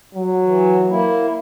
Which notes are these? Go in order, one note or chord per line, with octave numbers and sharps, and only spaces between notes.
F#3
E3
A#3 E4